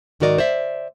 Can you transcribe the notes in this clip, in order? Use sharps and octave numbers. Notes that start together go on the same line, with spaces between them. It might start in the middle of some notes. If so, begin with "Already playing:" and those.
G#2 D#3 F#4 A#4 D5 D#5
C5 D5 E5